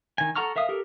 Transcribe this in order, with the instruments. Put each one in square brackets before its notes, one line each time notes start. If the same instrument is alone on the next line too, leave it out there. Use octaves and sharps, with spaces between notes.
[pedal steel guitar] D#3 G#5
A4 F#5 A#5 C#6 F6
A#4 E5 F5 D#6
G4 A4 A#4